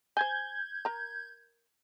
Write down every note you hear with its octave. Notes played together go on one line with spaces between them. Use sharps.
C5 G#5 G6 G#6
A#4 A#5